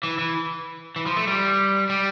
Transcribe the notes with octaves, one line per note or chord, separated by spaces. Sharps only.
E3
E3
E3
F3
A3
G3
G3